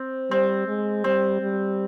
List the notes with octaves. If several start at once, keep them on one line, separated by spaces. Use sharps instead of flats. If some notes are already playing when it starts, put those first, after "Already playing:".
Already playing: C4
G3 C4
G#3
G3 C4
G3